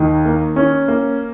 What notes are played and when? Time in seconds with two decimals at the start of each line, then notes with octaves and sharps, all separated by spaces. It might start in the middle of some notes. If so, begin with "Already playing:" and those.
Already playing: D#2 D#3
0.25 A#3
0.56 C#4
0.88 A#3